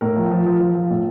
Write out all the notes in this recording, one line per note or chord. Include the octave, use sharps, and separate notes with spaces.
A2 A#4
F3
F3
F3
F3
F3
A2